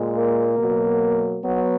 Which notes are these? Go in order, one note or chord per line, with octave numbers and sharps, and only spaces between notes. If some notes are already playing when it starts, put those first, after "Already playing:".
Already playing: A#2 G#3
A#3
B2 F#3
F#3 B3